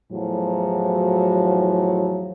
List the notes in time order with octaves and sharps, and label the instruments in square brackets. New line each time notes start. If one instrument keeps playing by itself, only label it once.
[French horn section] E2 A2 F3 F#3